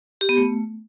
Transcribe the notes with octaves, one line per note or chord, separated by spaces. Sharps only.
G4
B3
A3